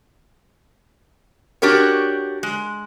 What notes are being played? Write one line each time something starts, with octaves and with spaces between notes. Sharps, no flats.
D4 F#4 G4 A#4 C#5
G#3